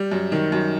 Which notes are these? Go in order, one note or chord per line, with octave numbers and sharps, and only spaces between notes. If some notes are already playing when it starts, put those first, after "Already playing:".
Already playing: G3
F#2
D#3
F#2